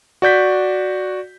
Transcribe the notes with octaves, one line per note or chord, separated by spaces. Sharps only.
F#4 D5 G6 B6